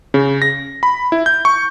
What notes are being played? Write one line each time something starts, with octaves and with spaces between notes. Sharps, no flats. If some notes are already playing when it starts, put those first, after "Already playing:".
C#3
A#6
B5
E4
G6
C#6